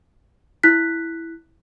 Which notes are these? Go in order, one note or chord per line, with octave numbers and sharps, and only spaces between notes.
E4 F#6 B6